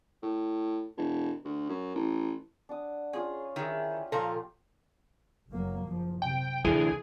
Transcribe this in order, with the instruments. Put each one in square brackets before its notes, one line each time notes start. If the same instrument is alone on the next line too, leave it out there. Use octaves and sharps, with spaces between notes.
[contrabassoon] A2
E1
D2
F#2
A1
[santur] D4 F#5 D#6
[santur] C#4 F4 F5 [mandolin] G#4
[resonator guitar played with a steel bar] D#3 [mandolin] E4 G#4 [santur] G4
[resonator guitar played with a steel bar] A#2 F3 [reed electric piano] A4 [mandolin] A#4 F5 A#5
[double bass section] F#1 F#3 A#3
F#1 F3
[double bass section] C3 [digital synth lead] G5
[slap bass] D2 E3 [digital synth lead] G#4